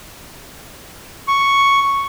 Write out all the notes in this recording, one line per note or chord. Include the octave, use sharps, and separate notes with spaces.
C#6